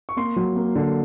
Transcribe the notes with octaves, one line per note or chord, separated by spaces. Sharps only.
C#6
A#3 C6
F#3
A#3
D3